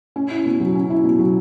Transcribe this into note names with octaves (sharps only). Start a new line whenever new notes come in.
C#4
E4
B2
F#3
C#4
E4
B2
F#3